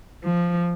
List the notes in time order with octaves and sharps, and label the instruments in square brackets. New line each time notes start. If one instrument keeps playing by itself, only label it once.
[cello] F3